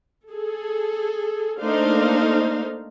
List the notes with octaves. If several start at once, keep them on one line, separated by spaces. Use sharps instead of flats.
G#4 A4
A3 A#3 D4 D#4 C5 F5